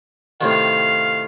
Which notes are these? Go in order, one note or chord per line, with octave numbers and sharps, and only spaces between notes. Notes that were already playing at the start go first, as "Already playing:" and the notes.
A2 C3 D#3 F5